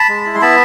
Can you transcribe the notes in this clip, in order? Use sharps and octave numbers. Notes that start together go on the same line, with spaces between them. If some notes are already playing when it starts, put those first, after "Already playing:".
Already playing: A5 B5
G#3
E4
C6
B3 A5 B5